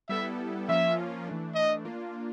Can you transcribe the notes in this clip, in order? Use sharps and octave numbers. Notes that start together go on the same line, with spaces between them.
G3 B3 E4 A4 E5
F3 A#3 C#4 F4 E5
E3 A3 D4
D#5
A#3 D4 F4